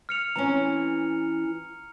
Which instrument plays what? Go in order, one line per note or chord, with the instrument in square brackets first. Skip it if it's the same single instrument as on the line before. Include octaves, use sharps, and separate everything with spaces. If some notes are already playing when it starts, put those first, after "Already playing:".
[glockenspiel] F6 C#7 F7
[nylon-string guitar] E3 C4 C#4 [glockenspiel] A#5